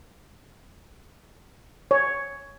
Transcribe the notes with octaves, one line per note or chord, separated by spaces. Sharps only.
C#5